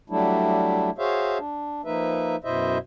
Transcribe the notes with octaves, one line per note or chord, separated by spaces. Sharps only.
F#3 G3 A3 D4 E4
F#4 G#4 C5 C#5 E5 F5
D4
F3 A#3 D#4 B4 E5
F#2 B2 E4 C5 D#5 E5